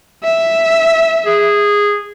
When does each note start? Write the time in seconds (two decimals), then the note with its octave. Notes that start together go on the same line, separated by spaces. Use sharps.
0.23 E5
1.26 G#4